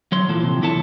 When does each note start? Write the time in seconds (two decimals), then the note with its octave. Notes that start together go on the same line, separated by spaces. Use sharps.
0.12 F#3 C#5 C6
0.29 A#2 E3 F3 A4
0.43 C3
0.62 E2 A#2 E4 A4 C#5 A5